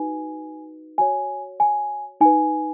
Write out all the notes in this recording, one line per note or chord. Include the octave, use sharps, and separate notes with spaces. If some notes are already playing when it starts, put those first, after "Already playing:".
Already playing: D#4 F#4 B4 G#5
F#4 C#5 G#5
G#5
D#4 B4 G#5